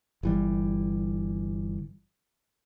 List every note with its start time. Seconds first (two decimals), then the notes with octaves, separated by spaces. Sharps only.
0.23 G1 E3 G3